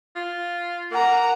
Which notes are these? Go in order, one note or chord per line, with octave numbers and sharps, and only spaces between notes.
F4
A#3 F#5 A#5